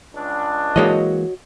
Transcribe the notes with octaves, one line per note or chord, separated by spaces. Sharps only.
C#2 D4
E3 G#3 A#3 F#4 C#5 D#5